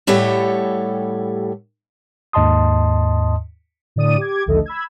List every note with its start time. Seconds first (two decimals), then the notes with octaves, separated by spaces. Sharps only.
0.07 A2 G3 G4 A4 C#5 F#5
2.33 D#2 G#2 D#5 A5 C6 D#6
3.96 A2 D3 D5 D#6 D#7
4.17 G4 D6 G#6
4.46 A#1 D#2 D3 A3 A4 D#5
4.66 B5 E6 G#6